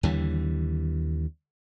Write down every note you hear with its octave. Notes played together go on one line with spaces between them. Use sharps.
D#2 D3 E3 G3